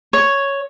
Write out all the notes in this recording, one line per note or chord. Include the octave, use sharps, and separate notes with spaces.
C#5